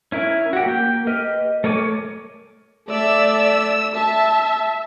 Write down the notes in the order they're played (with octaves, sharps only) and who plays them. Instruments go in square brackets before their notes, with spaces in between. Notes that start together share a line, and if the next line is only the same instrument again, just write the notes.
[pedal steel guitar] C#4 E4 A#4
F#4 G4
A#3 G5
G4 B4 D#5 F6
A3 A#4 C#5 G#5 D6
[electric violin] A3 E6 [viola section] D5 E5
[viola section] E5 [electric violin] A5